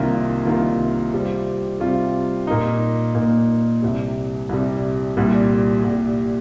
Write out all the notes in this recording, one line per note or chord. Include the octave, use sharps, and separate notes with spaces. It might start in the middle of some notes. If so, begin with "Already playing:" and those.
Already playing: C2 C3 D#3 A#3 F4
C2 C3 D#3 A#3 F4
C3 G3 C4 F4
C3 G3 C4 F4
A#2 A#3 D#4
A#2 A#3 D#4
C2 C3 G3
C2 C3 G3
C2 A#2 G3
C2 A#2 G3